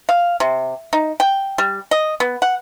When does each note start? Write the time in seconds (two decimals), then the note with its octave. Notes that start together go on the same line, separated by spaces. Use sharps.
0.09 F5
0.40 C3
0.93 D#4
1.20 G5
1.58 G3
1.91 D#5
2.20 B3
2.42 F#5